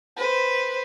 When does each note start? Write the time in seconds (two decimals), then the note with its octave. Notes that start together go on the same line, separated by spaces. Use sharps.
0.16 B4 C5